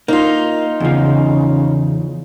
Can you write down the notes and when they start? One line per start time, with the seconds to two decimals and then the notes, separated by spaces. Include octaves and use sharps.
0.08 A#3 D#4 F4
0.80 E2 C#3 F3